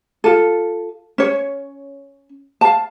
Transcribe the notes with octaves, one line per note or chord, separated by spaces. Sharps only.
F4 A4
C#4 C#5
F5 A5